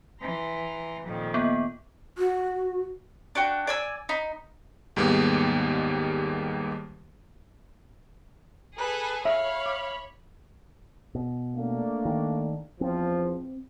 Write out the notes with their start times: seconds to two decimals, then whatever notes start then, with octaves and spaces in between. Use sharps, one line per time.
0.20 E3 A#5 C6
1.04 F2 A#2 D#3
1.34 A#3 B3
2.18 F#4
3.35 D4 F#4 G5
3.67 D5 G#5 E6
4.09 D#4 B5
4.96 D#2 G#2 G3 G#3 A#3 B3
8.78 G#4 A4 B4 G#5
9.25 C#5 E5 F5 B5
9.66 D6
11.15 B2
11.55 A3 A#3 D4
12.05 D#3
12.81 E2 F3 C4